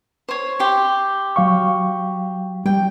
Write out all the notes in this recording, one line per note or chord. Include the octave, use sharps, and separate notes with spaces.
C5 C#5
G4 C6
F#3 F5 C#6
G3 G5